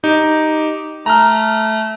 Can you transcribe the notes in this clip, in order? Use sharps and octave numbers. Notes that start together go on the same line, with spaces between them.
D#4 G4
A3 A#5 F6